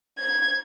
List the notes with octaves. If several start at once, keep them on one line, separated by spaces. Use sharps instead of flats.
G#6